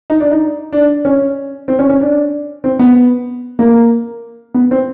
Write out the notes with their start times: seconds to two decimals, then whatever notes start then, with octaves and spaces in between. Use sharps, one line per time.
0.10 D#4
0.20 D4
0.31 D#4
0.73 D4
1.05 C#4
1.68 C4
1.79 C#4
1.89 C#4
2.01 D4
2.64 C4
2.79 B3
3.59 A#3
4.54 B3
4.71 C4